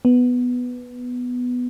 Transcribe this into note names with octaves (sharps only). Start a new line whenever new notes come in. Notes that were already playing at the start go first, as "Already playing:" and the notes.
B3